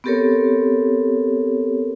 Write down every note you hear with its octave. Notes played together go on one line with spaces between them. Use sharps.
B3 C4 G4 A4 A#4 C#5